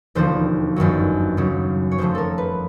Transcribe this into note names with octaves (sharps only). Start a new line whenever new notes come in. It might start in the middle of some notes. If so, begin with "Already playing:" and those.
E1 D#2 D3 F3 C5
G1 F#2 D#3 F#3
D#2 C#3 F#3
C#5
F#1 F2 C#3 F3 A3 C5
A4 A#4
B4